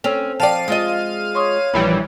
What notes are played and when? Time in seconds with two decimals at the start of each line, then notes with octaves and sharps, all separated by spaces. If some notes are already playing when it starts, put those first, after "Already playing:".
0.04 C4 C#4 A4 F7
0.40 F3 D5 F5 G5 A5 D#7
0.68 G#3 F4 D#5
1.35 C#5 C6 C#6 D#6
1.74 A#1 E3 G3 B5 C#7